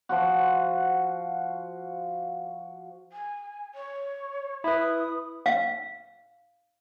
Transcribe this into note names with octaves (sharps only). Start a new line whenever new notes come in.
F3 F4 F#4
G#5
C#5
E4 B4 D#6
F5